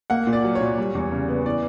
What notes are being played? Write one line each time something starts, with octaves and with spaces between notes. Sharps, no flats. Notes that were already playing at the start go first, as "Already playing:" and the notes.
A#3 F#5
A#2
D5
F#3
C#5
A#2
G3
E2
C#3
B3
E3 D5